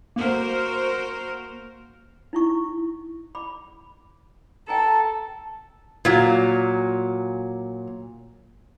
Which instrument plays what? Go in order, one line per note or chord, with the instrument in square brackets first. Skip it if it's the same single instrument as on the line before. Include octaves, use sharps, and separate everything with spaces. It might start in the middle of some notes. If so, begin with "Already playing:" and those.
[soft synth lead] A#3 [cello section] F#4 A#4 C5
[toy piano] D#4 E4 C#6
B5 D6
[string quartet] A4 [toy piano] G5 G#5 A#5
[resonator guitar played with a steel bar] A#2 F#3